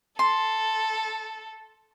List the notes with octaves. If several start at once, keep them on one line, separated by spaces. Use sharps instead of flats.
A4 C6